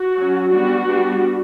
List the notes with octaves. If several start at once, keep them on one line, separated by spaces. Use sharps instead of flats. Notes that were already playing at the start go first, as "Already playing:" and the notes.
Already playing: F#4
F#3 C#4
G3 B3 D4 F#4
G3 B3 D4